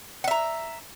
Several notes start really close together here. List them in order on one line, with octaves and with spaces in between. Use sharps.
F#5 E5 A#5